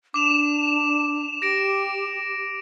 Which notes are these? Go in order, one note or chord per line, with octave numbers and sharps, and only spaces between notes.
D4 D6 E7 F7
G4 A#6 D7